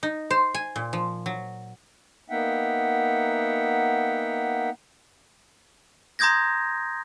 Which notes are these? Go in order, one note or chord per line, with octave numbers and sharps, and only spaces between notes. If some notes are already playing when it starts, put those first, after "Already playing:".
D#4
C5
G#5
A#2
F3
F#3
A#3 B3 D#4 E5 F#5 G5
A#5 C6 D#6 G6 G#6 A#6